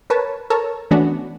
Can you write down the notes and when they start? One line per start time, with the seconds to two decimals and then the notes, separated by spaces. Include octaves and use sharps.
0.10 A#4 B4 C#5 A5
0.50 A4 A#4 C#5 A5
0.91 E3 A3 B3 C#4 D4 F#4